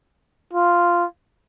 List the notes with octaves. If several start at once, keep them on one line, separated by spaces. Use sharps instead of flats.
F4